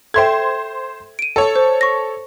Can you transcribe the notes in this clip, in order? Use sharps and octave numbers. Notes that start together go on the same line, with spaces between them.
A4 C5 E5 G5 C6 G#6
D7 D#7
A4 C#5
C5
C#6 A#6